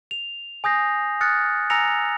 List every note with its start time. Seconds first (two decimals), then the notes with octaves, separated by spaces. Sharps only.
0.11 F7
0.64 G#5 D#6 G6 A#6 C7
1.21 D#6 F6 F#6 A6 C#7
1.70 G#5 A#5 E6 A#6 C#7 F7